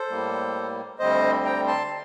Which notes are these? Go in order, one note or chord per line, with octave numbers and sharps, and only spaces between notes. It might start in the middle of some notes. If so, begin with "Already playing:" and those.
Already playing: A4 C5
A2 G3 A#3
D2 D3 G3 C4 C5 D#5
G5 A#5
A5 C6